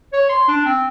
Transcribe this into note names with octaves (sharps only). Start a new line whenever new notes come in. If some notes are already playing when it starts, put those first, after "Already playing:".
C#5
C6
D4
C4